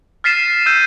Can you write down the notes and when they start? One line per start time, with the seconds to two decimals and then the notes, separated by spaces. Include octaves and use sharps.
0.24 F6 A6 B6 C7 D#7 E7
0.66 E6 G6 D#7